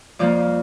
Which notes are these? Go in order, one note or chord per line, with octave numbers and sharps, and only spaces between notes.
F2 F3 A#3 D5